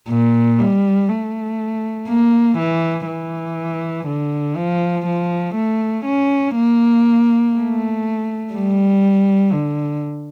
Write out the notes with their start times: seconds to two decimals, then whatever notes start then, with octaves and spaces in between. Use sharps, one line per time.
0.09 A#2
0.59 G3
1.09 A3
2.08 A#3
2.58 E3
3.07 E3
4.07 D3
4.56 F3
5.07 F3
5.55 A3
6.05 C#4
6.56 A#3
7.55 A3
8.54 G3
9.53 D3